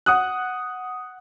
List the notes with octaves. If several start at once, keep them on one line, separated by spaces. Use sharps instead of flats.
F#5 D#6 F#6